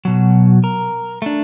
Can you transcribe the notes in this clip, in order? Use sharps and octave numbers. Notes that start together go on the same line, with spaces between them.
B2 F#3
A#4
A3 D4